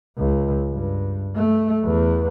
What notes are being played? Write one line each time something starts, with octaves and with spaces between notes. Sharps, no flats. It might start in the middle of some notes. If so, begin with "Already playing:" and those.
C#2
G2
A3
E2